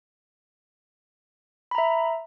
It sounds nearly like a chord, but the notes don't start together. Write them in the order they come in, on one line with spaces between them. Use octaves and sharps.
B5 A#5 E5